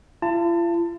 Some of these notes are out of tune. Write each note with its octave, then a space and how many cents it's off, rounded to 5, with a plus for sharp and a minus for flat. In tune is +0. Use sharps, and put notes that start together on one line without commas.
F4 -45 A5 +25